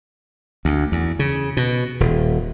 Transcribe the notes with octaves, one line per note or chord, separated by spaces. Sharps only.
D2
E2
C#3
B2
D#1